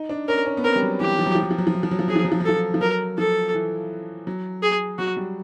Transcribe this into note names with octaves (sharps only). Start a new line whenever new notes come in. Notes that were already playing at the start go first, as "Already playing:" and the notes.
Already playing: D#4
D4
C#4 A#4
C#4
B3
C4 A#4
G3
F#3
E3 G4
F3
F#3
F3
F#3
F3
F#3
F3
F#3
F3
F#3
F3
F#3 G#4
F3
F#3
F3
F#3
F3 A4
F3
F#3 A#4
F3 A4
E3
F#3
G#4
F#3 F#4
G3